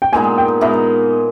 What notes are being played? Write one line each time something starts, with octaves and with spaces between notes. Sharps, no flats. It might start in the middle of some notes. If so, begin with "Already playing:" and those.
G5
A#2 G#3 B3 D#4 G#5
G5
A#2 G#3 B3 D#4 E5